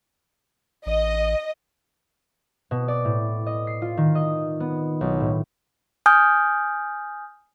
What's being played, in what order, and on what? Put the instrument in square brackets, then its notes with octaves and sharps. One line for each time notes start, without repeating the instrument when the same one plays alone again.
[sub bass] A1 [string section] D#5
[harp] B2
D5
A2
D#5
C7
F4
D#3
D#5
B3
B1
A2
[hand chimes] G#5 D#6 F6 G6